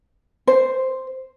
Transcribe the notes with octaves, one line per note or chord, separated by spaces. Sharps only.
C5